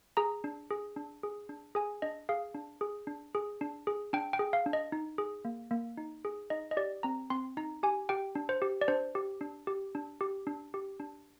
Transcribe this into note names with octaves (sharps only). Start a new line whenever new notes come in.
G#4 A#5
D4
G#4
D4
G#4
D4
G#4 G#5
D4 D#5
G#4 F5
D4
G#4
D4
G#4
D4
G#4
D4 G5
G5
G#4
F5
D4
D#5
D#4
G#4
A#3
A#3
D#4
G#4
D#4 D#5
D#5
G4 D5
C4 A#5
C4 C6
D#4 A#5
G4 G#5
G4 G5
D4
C5
G4
D5
D4 C5
G4
D4
G4
D4
G4
D4
G4
D4